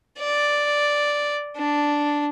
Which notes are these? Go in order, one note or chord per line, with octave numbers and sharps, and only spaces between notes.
D5
D4